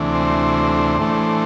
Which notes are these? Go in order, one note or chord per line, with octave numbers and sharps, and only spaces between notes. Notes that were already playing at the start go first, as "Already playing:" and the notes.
Already playing: D2 C3 E3 A3 D4
C5
A2 E3 A3 D4